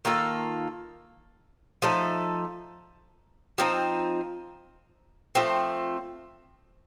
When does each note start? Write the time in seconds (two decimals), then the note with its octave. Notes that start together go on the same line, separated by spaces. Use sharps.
0.05 D#3 A#3 F4 A4
1.82 F3 A3 D#4 A4
3.58 F3 C4 D#4
5.35 F3 A3 C4